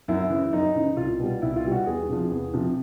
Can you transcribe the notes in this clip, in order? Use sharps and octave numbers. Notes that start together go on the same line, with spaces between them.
F#2 E4
C#3 E3
F#2 D#4
C#3 E3
C2 F4
B2 G3
C2 E4
F4
B2 G3
F#4
E2 G#4
C3 F3
E2
C3 F3